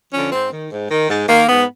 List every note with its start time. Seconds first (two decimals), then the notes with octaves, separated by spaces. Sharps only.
0.13 D3 F3 C#4
0.32 G#2 C4
0.52 D#3
0.71 G#2
0.90 D#3
1.09 G#2
1.28 D#3 A#3
1.48 G#2 B3